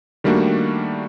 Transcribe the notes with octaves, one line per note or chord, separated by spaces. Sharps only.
D#3 G3 A3 A#3 D4 F#4